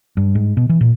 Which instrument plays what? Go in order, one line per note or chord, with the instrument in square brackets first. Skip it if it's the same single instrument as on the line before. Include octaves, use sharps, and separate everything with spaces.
[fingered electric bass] G2
G#2
B2
E3
A#2